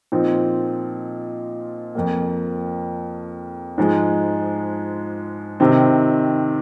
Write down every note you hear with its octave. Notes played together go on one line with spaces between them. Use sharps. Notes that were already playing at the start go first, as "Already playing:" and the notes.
A#2 F3 C4 D#4
F2 F3 A#3
G#2 F3 G#3
C3 D#3 C4